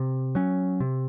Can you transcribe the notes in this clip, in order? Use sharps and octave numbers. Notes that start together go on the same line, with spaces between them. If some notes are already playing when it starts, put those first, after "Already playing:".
Already playing: C3
F#3 C#4
C3